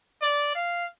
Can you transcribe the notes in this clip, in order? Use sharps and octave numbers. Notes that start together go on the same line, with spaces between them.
D5
F5